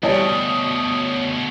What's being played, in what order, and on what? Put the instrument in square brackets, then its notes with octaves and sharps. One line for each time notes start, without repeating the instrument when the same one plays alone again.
[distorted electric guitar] D2 B2 [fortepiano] E3 G3 [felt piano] C#5 D5 A5 [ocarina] D#6